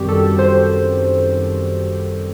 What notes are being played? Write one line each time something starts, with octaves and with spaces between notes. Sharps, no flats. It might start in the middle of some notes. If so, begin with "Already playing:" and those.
Already playing: F#2 D#3 G3 C4 F#4 G4
A4
C5